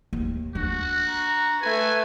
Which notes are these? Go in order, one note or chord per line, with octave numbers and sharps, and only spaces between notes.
D#2
D4 F#4
A#5
A3 B4 G#5